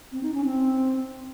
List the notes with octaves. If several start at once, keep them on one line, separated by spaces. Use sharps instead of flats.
C4
D#4
C#4
C4